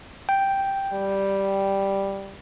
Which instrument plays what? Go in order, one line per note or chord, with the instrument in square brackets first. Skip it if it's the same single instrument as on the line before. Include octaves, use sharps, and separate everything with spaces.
[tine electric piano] G5
[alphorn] G3